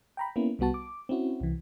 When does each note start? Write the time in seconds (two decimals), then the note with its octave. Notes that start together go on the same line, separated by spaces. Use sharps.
0.17 G5 A#5 B5
0.36 A#3 B3 C#4 E4
0.59 C2 G3 B3 F#4 A5
0.74 D6
1.09 C4 C#4 E4 F#4
1.40 C2 E3